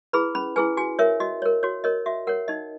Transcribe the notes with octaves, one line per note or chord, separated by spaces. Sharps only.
E4 G#4 B4 B5
C#4 B5
E4 G#4 B4 G#5
F#4 G#5
A#4 C#5 E5
F#4 D#5
A#4 C#5
F#4 C#5
A#4 C#5 D#5
F#4 E5
A#4 C#5 F#5
D#4 D#5